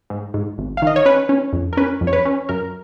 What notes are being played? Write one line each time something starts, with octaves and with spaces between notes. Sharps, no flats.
G#2
G#2
G#1
F5
D#3 D#5
C#5
C#4 B4
C#4
F2
A#4
C#4 B4
F2
C#5
B4
C#4
F#2 A#4